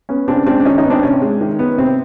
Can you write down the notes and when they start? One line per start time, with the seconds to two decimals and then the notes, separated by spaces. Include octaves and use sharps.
0.09 B3 C#4
0.28 C#3 C4 D4
0.46 G#3 C4 D4
0.60 D4
0.65 D#3 C#4 D#4
0.78 C#4 D#4
0.84 B3
0.90 C4 D4
1.03 C3 C#4
1.22 G#3
1.41 D#3
1.59 B3
1.78 C3 C4